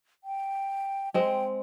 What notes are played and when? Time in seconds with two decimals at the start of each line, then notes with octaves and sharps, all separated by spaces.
0.24 G5
1.14 G#3 C4 G5